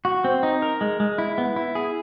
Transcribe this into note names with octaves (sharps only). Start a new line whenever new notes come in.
F#4
C4
D#4
A#4
G#3
G#3
E4
B3
E4
G#4